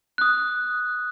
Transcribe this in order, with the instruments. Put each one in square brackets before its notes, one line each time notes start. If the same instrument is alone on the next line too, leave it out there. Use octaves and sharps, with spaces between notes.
[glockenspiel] D#6 F#6